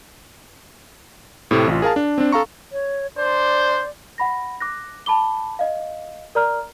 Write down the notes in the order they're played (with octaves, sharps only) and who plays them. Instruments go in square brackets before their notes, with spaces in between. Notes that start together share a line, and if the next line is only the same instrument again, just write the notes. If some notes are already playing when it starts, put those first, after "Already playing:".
[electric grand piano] A2 C3 A3 C4
A1 F4
G#4 A#4 F5 A5
D4
C4 D4
A4 F5 A#5 C#6
[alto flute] C#5
[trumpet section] D4 C5 [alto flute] D5
[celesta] F#5 B5 A#6
D6 F#6 A#6
A5 B5 D6 G7
D#5 F5
A#4 D5 A#5 F6